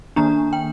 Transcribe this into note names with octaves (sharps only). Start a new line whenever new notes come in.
D#3 A#3 D4 A#5
G5